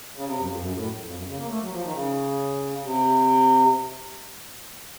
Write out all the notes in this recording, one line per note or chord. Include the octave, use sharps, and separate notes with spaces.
C#3
C3
F#2
F2
F#2
A2
F2
F#2
C#3
A#3
A3
F#3
F3
D#3
C#3
C3